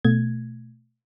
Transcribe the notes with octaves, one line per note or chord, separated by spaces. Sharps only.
B2 A3 G#6